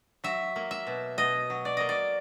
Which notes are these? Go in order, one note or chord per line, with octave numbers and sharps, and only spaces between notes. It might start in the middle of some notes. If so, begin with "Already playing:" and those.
F#3 E5
A#3
E5
B2
B2 D#5
F#3
D5
A#3 D#5
D5